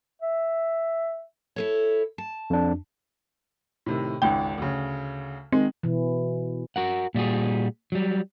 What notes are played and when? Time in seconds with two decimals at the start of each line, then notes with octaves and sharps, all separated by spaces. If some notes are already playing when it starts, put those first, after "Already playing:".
0.22 E5
1.56 E4 A4 C#5
2.18 A5
2.50 F2 D4
3.86 A2 C3 D#3
4.22 G#1 C#2 G#2 G5
4.58 D2 C#3
5.52 D#3 G#3 C4
5.83 B2 E3
6.76 F#4 A#4 F#5
7.15 A#2 G3 F#4 G#4
7.92 F#3 G3